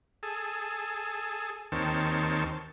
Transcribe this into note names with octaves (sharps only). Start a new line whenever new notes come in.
G#4 A4
D#2 D#3 C4 C#5 A5